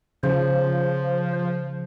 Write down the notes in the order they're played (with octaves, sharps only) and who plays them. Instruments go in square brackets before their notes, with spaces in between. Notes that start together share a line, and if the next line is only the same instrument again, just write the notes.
[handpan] C#3 [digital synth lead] F3 [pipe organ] C5